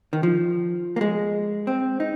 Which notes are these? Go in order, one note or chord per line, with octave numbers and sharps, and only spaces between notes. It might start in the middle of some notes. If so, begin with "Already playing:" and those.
D#3
F3
A#3
G#3
C4
D#4